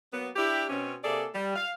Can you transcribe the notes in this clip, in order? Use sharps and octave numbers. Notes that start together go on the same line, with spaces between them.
F#3 A#3 B3
D4 E4 G4
B2 C4 C#4
C3 A#3 G#4 A4 D5
G3
F5